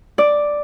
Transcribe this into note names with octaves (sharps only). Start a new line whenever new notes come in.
D5